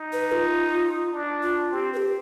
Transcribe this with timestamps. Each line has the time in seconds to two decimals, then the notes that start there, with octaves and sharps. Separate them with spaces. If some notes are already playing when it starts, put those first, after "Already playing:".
Already playing: D#4
0.13 B4
0.32 F4
1.12 D4
1.42 F4
1.72 C4 G4
1.93 B4
1.97 G4